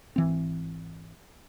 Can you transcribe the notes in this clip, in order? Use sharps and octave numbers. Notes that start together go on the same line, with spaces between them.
G#1 E3 C4